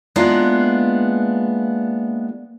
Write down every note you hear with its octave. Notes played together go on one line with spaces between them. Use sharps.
G#3 A#3 B3 D4 E4 F4